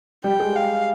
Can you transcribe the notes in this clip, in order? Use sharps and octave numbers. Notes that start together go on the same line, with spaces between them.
G3 G5
G#3
F5